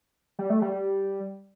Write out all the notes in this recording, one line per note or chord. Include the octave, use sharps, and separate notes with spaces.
G3
A3
G3